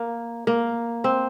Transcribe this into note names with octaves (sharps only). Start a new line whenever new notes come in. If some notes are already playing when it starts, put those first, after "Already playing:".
Already playing: A#3
A#3
C4